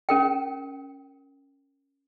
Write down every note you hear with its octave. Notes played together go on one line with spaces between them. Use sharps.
C#4 A#4 G5